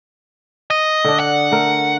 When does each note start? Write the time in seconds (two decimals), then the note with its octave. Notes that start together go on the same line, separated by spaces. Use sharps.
0.70 D#5
1.04 D3 D4
1.20 F#5
1.51 A3 A#4